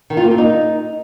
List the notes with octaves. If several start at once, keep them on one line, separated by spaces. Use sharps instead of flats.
D#3
F4
A#3
C4
D#4